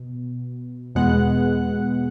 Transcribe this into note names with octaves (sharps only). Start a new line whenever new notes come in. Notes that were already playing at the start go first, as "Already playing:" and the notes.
Already playing: B2
E2 B2 G#3 B3 F#5 F#6